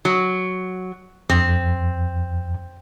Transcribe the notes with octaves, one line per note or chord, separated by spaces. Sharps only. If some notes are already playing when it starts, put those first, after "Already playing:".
F#3
F2 C4